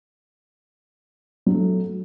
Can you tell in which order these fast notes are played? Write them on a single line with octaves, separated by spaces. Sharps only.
F#3 F#4 A3